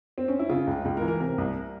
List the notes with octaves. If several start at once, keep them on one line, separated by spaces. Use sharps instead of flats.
C4
C#4
E4
C#3 F4
C#2
C#2
A#4
E3
A#4
C3 A#4
C2